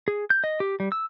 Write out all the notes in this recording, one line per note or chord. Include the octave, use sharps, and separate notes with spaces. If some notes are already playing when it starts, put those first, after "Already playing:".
G#4
G6
D#5
G4
G3
E6